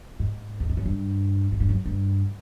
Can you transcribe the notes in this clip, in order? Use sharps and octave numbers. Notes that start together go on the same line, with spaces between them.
G#2
E2
F2
F#2
G2
G#2
G2
F#2
G2